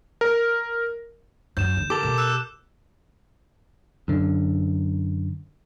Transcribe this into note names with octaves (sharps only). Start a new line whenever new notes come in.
A#4
F#2 G6 E7
D3
G4 A4 A#4 D6 E7
B2
E6 F#6 E7
F#2 D3